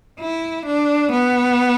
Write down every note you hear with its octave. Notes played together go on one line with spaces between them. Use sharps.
E4
D4
B3